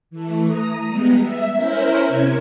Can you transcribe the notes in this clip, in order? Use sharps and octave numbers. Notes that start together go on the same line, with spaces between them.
E3 A3
A#5 D#6
G3 G#3 B3
E5
C#4 E4 A#4 C5
C3 G#6